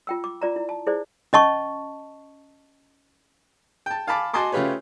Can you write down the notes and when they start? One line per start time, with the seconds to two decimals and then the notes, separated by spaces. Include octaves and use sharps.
0.07 F4 G5 E6
0.24 D6
0.41 F4 D5 A#5
0.56 E4
0.69 A5
0.87 E4 G#4 C5 D5
1.33 C#4 D#5 A5 C#6
3.86 G5 A5
4.07 F5 G#5 A5 B5 D6
4.34 F#4 D#5 G#5 A5 C6 D6
4.52 C#3 A3 F4 G4 B4 C#5